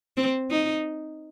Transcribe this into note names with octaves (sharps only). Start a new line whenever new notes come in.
C4
D#4